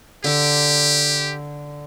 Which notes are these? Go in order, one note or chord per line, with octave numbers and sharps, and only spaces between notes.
D3 G4 D6